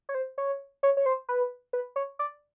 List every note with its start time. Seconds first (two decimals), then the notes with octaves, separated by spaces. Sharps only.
0.09 C#5
0.15 C5
0.38 C#5
0.83 C#5
0.97 C#5
1.06 C5
1.29 B4
1.73 B4
1.96 C#5
2.19 D5